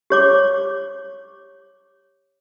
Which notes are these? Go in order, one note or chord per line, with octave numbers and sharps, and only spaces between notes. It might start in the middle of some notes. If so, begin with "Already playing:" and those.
G4 C#5 D6